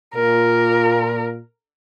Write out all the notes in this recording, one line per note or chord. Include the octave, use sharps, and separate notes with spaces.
A#2 A#4